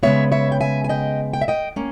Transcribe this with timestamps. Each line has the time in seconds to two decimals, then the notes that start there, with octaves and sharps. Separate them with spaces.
0.03 C#3 G#3 B3 C#5 E5
0.32 C#5 E5
0.52 G5
0.61 E5 G#5
0.84 G#5
0.89 D#5 G5
1.33 G5
1.42 E5
1.48 D#5 G5
1.76 A#3 C#4